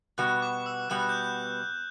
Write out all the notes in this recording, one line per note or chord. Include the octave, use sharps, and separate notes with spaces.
B2 G3 B3 F#4 F#6
D6
E6
B2 G3 B3 F#4 F#6
G6